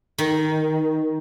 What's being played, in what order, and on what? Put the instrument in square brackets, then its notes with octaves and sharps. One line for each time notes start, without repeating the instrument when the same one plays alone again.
[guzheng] D#3